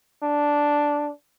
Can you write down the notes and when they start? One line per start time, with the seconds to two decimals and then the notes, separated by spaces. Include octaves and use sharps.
0.23 D4